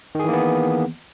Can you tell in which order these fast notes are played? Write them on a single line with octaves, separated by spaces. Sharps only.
D#3 G#4 E3 A#3 B3